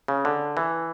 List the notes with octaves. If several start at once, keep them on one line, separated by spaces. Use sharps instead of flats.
C#3
D3
E3